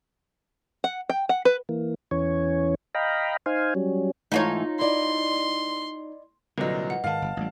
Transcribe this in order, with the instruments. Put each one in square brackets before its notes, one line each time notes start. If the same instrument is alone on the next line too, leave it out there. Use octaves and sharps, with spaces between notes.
[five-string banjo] F#5
G5
F#5
B4
[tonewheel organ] E3 A#3
E2 E3 C#4 C#5
D#5 F5 G5 A#5 B5
D#4 C5 F5 G#5
F#3 G3 C#4
[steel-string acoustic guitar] G#2 E3 A3 [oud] D#4 F4 C#5
[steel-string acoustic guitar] E4 D5 D#5 [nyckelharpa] C6
[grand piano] C2 A#2 F#3 [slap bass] D3 [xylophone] B4 D#5
[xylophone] F#5
[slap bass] G#2 D#3 [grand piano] F5 A5
[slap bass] G1
A1 G3